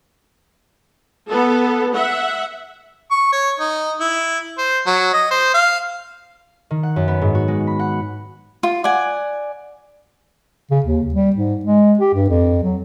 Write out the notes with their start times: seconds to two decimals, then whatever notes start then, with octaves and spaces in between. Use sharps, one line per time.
1.30 B3 A4
1.96 E5 F#5
3.11 C#6
3.32 C#5
3.60 D#4
4.00 E4
4.58 C5
4.86 F#3
5.13 D#5
5.31 C5
5.54 F5
6.71 D#3
6.83 F#5
6.96 F#2
7.08 B3
7.22 G#2
7.35 F#4
7.48 G#3
7.67 B5
7.79 F#5
8.63 F4
8.84 D5 F#5 G#5
10.71 C#3
10.84 D#2
11.14 G3
11.36 G#2
11.65 G#3
11.99 G4
12.14 G2
12.29 F2
12.63 F#3